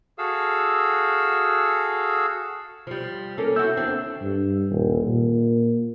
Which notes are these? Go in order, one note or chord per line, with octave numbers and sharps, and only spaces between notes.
F#4 G#4 A4 F5 E6
F3 G3
A#3 C#4 A4
E4 F#4 E6 G6
D#2 C4 D4
G2
D#1
A#2